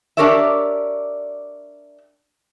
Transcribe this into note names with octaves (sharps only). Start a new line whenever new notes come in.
D4 G4 A#4 C#5 D5 E5